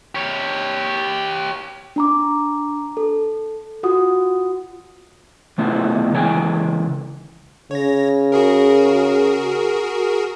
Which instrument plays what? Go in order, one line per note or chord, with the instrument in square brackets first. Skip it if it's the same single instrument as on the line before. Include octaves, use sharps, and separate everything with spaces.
[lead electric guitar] G4 C#5
[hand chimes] D4 A#5 D6
A4
F4 F#4 F#5 D#6
[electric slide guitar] D#3 A3 B3 D4 E4 F4
C#3 E3 G#3 C#5 G5 G#5
[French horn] C#3 [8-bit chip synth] C#5 A#6
[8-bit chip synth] F#4 G#4 A#4